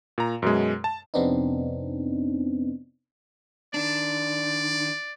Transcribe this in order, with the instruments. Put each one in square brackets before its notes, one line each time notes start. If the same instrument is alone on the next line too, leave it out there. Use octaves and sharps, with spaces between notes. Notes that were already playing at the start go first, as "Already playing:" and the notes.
[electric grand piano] A#2 A#5
F#2 B2 G#3
A5
[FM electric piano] F2 C3 B3 C4 D4 D#4
[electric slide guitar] D#3 D4 [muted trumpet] D5